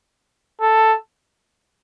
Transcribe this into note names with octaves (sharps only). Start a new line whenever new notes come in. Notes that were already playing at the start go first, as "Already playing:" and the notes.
A4